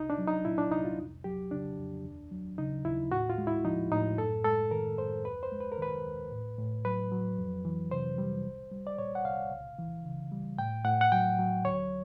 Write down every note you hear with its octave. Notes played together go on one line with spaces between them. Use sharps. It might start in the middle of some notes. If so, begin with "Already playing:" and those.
Already playing: C2 D#4
D4
F#3
D#4
A#2 E4
D4
C2 D#4
F4
F2
F#3 G4
C#3 D4
F2
D#2
F#3
C#3 D#4
D#2 E4
A2 F#4
F4
G#3
E4
F3 D#4
A2 D#4
F#2 A4
G#3 A4
D#3 A#4
F#2 C5
D#2 B4
C5
G#3
B4
A#4
D#3 B4
D#2
A2
A2
F#3 B4
F#3
F2
E3
C3 C5
G3
C2
G3
D5
A#2 C#5
F#5
C2 F5
C#2
E3
C#3
G3
A2 G5
A2 F#5
F#5
F#3 G5
F#3
D2 C#5